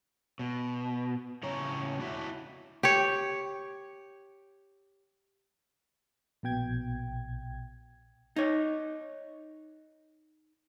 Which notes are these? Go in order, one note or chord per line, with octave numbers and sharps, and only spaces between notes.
B2
A2 C#3 C#4 C#5 A#5
D4 E4 F#4 E5
G4 C#5
A#1 B2 G5 G#6
D#4 C#5